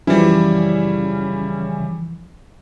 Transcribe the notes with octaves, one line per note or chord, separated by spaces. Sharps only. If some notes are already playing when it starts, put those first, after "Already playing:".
F#2 C#3 E3 F3 G3 C#4 E4